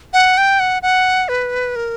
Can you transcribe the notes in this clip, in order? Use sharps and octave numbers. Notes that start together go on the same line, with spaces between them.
F#5
G5
F#5
F#5
B4
A#4